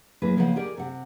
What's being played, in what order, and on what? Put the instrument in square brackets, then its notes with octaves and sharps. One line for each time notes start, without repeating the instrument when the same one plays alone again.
[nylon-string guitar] F#3 A#3 E4 G#4 B4
C#3 F3 A#3 B4 D#5 F#5
G4 G#4 A#4 D5
C3 F#5